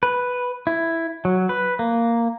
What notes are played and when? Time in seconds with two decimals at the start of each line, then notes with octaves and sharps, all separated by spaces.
0.03 B4
0.67 E4
1.25 F#3
1.49 B4
1.79 A#3